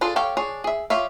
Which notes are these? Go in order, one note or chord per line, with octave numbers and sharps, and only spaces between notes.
D4 F4 G#4 A4 D5
G4 A4 C#5 F5 G5
D4 G#4 C#5
G#4 E5
F4 G4 C#5 E5 F5